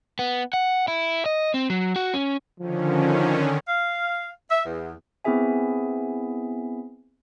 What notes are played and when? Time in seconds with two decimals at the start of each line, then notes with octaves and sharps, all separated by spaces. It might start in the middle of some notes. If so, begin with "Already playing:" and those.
0.19 B3
0.54 F#5
0.88 E4
1.26 D#5
1.54 C4
1.70 F#3
1.96 F#4
2.14 C#4
2.60 D3 D#3 F3 C#4
3.69 F5
4.51 E5
4.66 E2
5.25 B3 C4 E4 G#4 E5 G#5